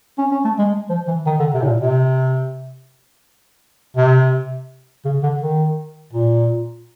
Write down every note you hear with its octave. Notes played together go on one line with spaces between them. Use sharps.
C#4
C#4
A3
G#3
F3
E3
D#3
D3
C3
A2
A#2
C3
C3
C#3
D3
D#3
A#2